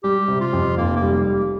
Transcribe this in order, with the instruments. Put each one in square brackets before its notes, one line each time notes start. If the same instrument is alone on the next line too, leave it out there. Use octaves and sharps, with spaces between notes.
[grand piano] G3 [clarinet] G4
[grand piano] C3
[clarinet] F4
[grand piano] F2
[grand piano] F1 [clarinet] A#3
[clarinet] A#3
[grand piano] G3